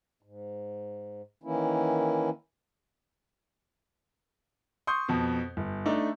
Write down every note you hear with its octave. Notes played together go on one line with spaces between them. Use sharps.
G#2
D#3 E3 A#3 C#4 E4
C6 C#6 D#6 G6
F2 B2
G1
A3 D4 D#4